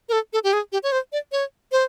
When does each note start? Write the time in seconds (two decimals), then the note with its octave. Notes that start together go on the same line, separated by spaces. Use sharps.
0.09 A#4
0.12 A4
0.33 A4
0.44 G4
0.53 G#4
0.72 G4
0.83 C#5
0.92 C5
1.12 D5
1.32 C#5
1.72 C5